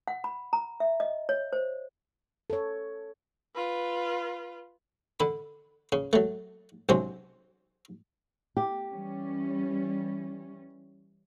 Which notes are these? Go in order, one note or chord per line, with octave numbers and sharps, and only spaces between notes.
F#5
B5
A#5
E5
D#5
C#5
C5
A4 C#5
F4 B4
D3 B5
C#3
F#3 A3
B1 C3 F#3 C#4 C5
G4
E3 G3 C#4